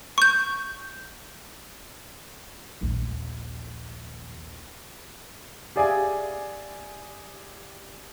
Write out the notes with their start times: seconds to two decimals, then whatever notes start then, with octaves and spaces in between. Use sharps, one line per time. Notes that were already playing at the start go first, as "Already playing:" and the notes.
0.18 C#6 G6
2.81 A#1 D#2
5.76 G4 G#4 D5 E5 F5 G#5